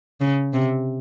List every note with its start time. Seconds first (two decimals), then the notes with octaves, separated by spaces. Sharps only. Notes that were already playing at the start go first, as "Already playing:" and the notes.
0.21 C#3
0.54 C3